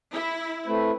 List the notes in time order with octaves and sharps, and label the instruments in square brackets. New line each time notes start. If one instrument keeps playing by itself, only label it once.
[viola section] E4
[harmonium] A3 [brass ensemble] C4 E4 B4